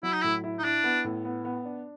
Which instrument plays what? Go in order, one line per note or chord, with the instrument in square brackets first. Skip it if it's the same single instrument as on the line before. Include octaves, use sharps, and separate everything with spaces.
[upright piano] F#3 [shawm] E4
[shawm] D#4
[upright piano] A2 [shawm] E4
[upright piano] E4
[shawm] D#4
[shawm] D4 [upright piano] E4
[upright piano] B3
A2
B3
B3
D4